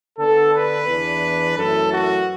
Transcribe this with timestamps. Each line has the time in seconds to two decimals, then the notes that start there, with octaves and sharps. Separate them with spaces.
0.19 D3 B3 D4 A4
0.54 B4
0.88 E2 E3 D4
1.57 F#2 E3 A3 A4
1.91 F#4